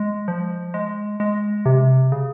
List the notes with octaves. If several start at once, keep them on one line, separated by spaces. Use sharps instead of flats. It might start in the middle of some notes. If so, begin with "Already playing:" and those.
Already playing: G#3
F3
G#3
G#3
C3
C#3